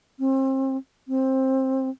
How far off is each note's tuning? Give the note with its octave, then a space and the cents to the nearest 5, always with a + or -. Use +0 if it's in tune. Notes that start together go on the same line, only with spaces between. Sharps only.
C4 +35
C4 +15